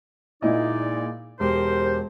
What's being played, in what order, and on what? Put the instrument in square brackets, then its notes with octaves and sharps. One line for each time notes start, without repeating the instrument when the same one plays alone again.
[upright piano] A#2 E4 D#5 [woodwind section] G#3 D#4 D5
[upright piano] E1 [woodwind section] G4 A#4 C5